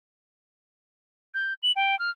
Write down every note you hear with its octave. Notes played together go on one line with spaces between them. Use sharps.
G6
F#7
G5
F6